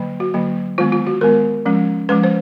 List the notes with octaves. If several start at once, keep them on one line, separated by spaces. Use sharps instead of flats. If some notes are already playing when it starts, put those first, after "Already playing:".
Already playing: D3 F#3 A#3
F#4
D3 F#3 A#3
D#3 G#3 B3 F4
F4
F#4
D#3 G#3 B3 A#4
F3 G#3 C#4
F3 G#3 C#4 B4
C5